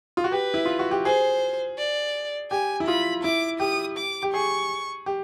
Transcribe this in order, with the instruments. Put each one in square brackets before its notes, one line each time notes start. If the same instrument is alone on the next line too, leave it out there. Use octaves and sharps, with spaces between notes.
[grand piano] F4
F#4
[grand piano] G4 [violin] B4
[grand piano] E4
F4
F#4
G4
[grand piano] G#4 [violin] C5
[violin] D5
[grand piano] G4 [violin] G#5
[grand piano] E4
[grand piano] F4 [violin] B5
[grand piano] E4 [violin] D6
[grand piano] G4 [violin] D#6
[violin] D6
[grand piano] G4
[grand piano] G#4 [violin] C#6
[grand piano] G4